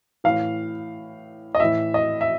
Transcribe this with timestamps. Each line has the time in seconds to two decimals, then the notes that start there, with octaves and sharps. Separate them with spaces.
0.24 A2 E3 F5
1.55 D#5
1.60 A2 E3 E5
1.94 D#5
2.21 E5